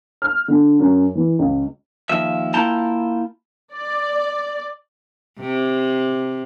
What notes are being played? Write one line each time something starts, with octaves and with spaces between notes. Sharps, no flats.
F6
D3
F#2
E3
C#2
D#2 F3 E5
A#3 E4 F4 G5 A5 A#5
D5
C3